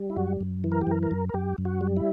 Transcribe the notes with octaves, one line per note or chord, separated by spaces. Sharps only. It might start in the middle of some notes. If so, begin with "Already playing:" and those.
Already playing: G3
E4
F#2 F#4
F#2
E3
A#4
G4
F#2 A#4
A#4
F#2
A#4
F#2 G4
F#2
F#4
G3
E4